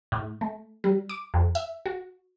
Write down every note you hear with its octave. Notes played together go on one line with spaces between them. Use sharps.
A2
A3
G3
D6
F2
E5
F#4